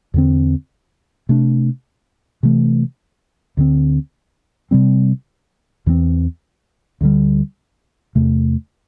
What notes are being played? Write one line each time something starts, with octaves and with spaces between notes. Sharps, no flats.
E2 D3 C4
C3 A3 D4
C3 E3 A3
D2 D3 C4
C3 G3 C4
E2 E3 A3 C4
D2 D3 G3
E2 C3 A3